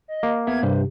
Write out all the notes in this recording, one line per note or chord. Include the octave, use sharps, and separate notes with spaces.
D#5
A#3
B3 B4 E5 G#6
G2 C3 B4 C5